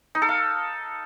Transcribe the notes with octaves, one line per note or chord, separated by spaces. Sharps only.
D#4
A4
F5